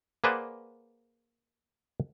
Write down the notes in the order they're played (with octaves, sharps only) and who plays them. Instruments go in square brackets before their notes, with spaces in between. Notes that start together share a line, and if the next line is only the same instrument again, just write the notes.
[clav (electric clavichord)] A#3 G#4 B4 C5 D5 F#5